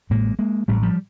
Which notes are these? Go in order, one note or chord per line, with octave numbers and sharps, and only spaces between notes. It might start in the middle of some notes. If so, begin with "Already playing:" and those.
A1 A2 G#3 A#3
G#3 A#3
A1 A2 G3 A3
F3 G3